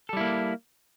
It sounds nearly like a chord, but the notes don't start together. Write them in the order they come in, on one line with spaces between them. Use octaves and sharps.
A4 G3 E4 A#3